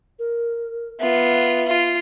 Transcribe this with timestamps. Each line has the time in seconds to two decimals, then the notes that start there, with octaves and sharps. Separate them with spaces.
0.19 A#4
1.00 B3 F4 E5
1.68 F4